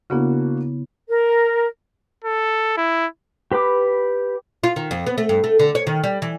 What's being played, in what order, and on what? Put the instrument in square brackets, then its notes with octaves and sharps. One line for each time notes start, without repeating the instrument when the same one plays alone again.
[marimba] C#3 B3 E4 [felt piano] A#3 D4 F#4
[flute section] A#4
[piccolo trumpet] A4
E4
[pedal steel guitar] G4 B4 B5 D6
[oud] F4
D#3
F2
B3
A3
G2
A3
D3
C#5
D#3
G3
E3